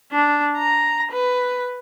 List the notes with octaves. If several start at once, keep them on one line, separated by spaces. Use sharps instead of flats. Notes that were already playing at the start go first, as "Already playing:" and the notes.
D4
A#5
B4